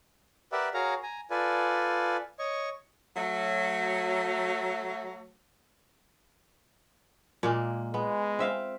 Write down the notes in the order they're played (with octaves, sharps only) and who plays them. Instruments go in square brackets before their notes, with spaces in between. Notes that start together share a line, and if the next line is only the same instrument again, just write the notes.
[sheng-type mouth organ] G4 A#4 B4 D5 E5 F#5
F#4 G#4 A#4 C#5 F5 A#5
G#5 A#5
F4 A4 B4 D5 G#5
C#5 D#5 C#6
[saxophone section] F#3 A3
[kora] A#2 G#3 A#3
[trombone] G#3 [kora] B3
[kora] C4 E5 F5